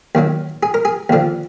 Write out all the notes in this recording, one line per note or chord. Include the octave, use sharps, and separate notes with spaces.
D#2 D#3 F#3
G#4
A#4
G#4
D#2 D3 F3